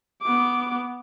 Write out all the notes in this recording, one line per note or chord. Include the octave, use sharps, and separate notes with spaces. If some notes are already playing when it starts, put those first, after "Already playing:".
B3 D6